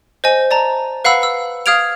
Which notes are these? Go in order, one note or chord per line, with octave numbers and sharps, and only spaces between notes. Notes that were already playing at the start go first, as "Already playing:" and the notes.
C5 D#5 G#5
D5 A5 A#5
B4 F5 F#5 B5 E6
E6
F5 D#6 F6 G#6 D7 F7